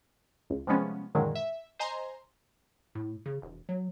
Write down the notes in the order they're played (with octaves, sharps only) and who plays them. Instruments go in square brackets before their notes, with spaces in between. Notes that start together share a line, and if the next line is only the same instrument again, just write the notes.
[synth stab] C#2
C3 F3 G3 G#3 B3 C#4
F#2 A#2 D3 D#3 F#3 G#3
E5
C5 D#5 G#5 A#5 C6
[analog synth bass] A2
C#3
E1
F#3